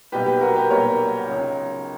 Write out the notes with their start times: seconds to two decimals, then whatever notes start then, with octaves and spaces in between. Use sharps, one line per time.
0.12 B1 A#2 G3 G4 B4
0.26 G4 B4
0.41 F#4 A#4
0.56 G4 B4
0.70 B1 A#2 G3 A#4 C#5
1.28 C#2 C#3 F#3